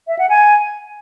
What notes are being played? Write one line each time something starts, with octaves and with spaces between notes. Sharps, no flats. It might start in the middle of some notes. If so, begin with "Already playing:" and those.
E5
F#5
G#5